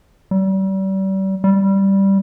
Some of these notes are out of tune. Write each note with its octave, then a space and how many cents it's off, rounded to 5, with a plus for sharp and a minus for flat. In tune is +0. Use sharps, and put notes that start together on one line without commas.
G3 -35
G3 -5